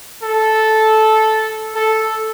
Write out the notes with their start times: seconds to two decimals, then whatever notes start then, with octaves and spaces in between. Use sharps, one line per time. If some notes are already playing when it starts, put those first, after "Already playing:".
0.23 A4
1.75 A4